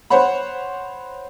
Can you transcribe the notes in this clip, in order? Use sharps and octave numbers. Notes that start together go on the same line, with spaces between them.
C5 C#5 F#5 B5